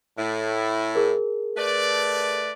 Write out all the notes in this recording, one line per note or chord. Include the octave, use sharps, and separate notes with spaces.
A2 E4
G#4 A#4
A3 B4 D5